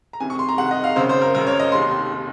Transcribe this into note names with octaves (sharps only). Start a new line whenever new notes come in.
A#5
C2 C3 D#3 G#5
C#6
C6
A#5
C2 C3 D#3 F#5
D#5
F5
G#1 F#2 C#3 C5
C5
A#4
G#1 F#2 C#3 A#4
C#5
D#5
F1 D#2 D#3 C6
D#3